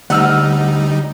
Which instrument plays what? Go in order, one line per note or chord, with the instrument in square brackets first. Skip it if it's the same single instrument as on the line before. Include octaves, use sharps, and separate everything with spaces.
[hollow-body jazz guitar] D2 [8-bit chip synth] G3 D#4 [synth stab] F#5 E6 F6